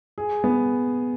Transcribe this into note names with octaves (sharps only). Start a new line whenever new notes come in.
G#4
B3